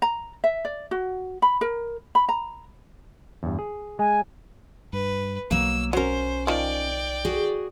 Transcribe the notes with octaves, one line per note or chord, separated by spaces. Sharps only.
A#5
E5
D5
F#4
B5
A#4
B5
A#5
E2 G2
G#4
G#3 G#5
G2 B4
B1 F#3 A#3 E6
F#3 C#4 A#4 C5 A#5
D#3 F3 D5 G5
F#4 G#4